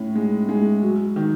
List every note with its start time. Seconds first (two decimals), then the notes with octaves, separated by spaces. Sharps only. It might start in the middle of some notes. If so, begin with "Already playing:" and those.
Already playing: A2 C#4
0.15 G#3
0.49 G#3
0.82 F#3
1.16 D#3